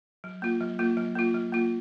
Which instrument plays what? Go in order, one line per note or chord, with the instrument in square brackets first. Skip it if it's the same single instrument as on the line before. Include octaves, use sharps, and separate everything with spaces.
[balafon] F#3
A#3 F4
F#3
A#3 F4
F#3
A#3 F4
F#3
A#3 F4